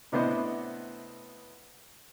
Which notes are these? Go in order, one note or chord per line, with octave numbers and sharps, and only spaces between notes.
A2 C3 B3 D4 C5 D#5